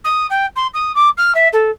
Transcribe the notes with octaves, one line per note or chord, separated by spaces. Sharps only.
D#6
G5
C6
D#6
D6
F6
E5
A4